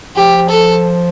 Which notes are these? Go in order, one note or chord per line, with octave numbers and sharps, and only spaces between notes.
F3 G4
A4